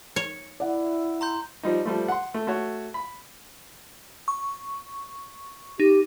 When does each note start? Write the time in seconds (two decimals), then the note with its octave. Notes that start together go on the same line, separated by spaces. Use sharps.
0.16 C#5
0.60 E4 D5 E5 F#5
1.21 A#5 C6 G6
1.63 F3 G3 D#4
1.86 F3 G3 A3
2.08 F#5 C6
2.34 A3
2.47 A3 F#4 C#5
2.94 B5
4.28 C#6
5.80 D#4 G4